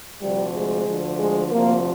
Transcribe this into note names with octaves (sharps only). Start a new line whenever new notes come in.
D2 C3 F3 G3
G#3
D2 D3 F3
G#3
D2 C3 F3 A#3